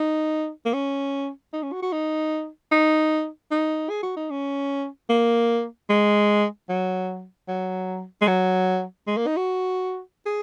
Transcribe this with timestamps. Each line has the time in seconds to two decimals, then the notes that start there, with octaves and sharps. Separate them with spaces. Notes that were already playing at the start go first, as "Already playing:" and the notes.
Already playing: D#4
0.66 A#3
0.74 C#4
1.53 D#4
1.63 C#4
1.73 F#4
1.83 F#4
1.92 D#4
2.72 D#4
3.51 D#4
3.90 G#4
4.03 F#4
4.17 D#4
4.31 C#4
5.10 A#3
5.90 G#3
6.69 F#3
7.48 F#3
8.22 G#3
8.28 F#3
9.07 G#3
9.17 A#3
9.27 D#4
9.37 F#4
10.26 G#4